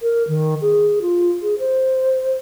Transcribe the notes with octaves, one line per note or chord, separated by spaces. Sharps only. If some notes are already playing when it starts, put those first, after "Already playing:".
A#4
D#3
G#4
F4
G#4
C5